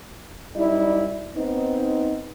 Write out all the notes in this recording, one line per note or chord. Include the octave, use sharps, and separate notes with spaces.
F#2 G3 D#4 E4 D5
B3 C4 D#4